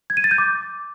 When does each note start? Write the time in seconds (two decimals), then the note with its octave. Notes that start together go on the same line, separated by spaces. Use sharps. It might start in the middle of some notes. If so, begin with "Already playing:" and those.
0.10 G#6
0.17 D#7
0.24 A6
0.31 G6
0.38 D6